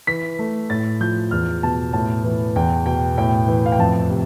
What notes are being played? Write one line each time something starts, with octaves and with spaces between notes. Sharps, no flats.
E3 B6
A3
A2 A6
F3 G6
E2 F6
B2 A5
A2 A5
E3
E2 G5
B2 G5
A2 G5
E3
F5
G5
F2 A5
C3